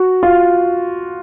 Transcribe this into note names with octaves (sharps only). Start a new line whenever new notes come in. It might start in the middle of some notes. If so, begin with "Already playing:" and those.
Already playing: F#4
F4